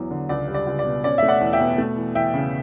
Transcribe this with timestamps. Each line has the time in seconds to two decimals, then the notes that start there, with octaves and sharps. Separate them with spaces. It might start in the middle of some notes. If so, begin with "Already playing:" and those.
Already playing: E2 F#3 B3
0.11 D3
0.29 C#2 D5
0.48 G3
0.54 D5
0.67 C#2
0.79 D5
0.85 B2
1.04 C#4 D5
1.18 A3 E5
1.28 D5 F#5
1.41 E2
1.53 E5 G5
1.60 B2
1.78 A3
1.96 E3
2.15 E2 E5 G5
2.34 C#3